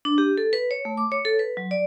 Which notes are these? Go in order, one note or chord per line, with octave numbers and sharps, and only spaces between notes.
D4
G4
A4
B4
C#5
A3
D6
C#5
A4
B4
F#3
D5